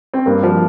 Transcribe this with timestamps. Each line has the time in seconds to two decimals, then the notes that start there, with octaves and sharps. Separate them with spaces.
0.14 C4
0.26 G2 A#3
0.43 F3